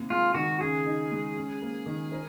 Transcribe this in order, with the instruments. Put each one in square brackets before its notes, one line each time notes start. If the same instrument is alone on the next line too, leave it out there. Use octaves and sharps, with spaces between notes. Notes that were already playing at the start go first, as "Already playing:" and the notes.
Already playing: [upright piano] D#2 C3
[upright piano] G#3 [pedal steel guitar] F4
[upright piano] D#3 [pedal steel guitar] F#4
[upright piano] C#3 [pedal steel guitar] G#4
[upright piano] D#4
G#3
C#4
A#3
D#3
A#4